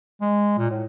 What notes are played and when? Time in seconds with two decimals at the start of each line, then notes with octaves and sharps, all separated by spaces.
0.21 G#3
0.58 A#2
0.71 A2